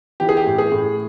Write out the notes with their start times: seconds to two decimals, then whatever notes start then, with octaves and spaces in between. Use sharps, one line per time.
0.20 E3 G4
0.29 G#4
0.37 G4
0.47 A2
0.58 G#4
0.72 A2